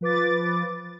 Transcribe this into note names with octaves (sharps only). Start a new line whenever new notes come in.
F3 B4 D6 A6